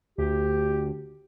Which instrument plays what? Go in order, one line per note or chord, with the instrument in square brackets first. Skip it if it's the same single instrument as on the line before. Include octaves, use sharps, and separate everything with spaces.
[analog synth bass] D2 [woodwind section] G4